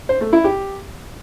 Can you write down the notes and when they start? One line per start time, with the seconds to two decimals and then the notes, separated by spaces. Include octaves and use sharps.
0.09 C5
0.21 A3
0.33 E4
0.44 G4